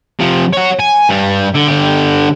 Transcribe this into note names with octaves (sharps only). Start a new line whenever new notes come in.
C3 F3
C#5 F#5
G#5
G2 G3
D3
D3 G4